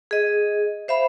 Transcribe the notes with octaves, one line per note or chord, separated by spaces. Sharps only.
G#4 D#5
C5 E5 F5 B5